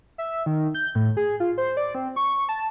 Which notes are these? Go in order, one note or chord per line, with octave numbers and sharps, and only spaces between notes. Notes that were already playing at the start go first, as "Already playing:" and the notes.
E5
D#3
G6
A2
G#4
F4
C5
D5
C4
C#6
A5